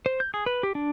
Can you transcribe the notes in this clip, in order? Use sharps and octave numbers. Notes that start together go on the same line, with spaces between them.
C5
G6
G#4
B4
G4
D4